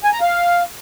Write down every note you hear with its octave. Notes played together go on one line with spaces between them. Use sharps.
G#5
A#5
F5